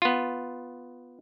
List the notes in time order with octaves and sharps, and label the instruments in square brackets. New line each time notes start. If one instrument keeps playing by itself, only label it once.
[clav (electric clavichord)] B3 F4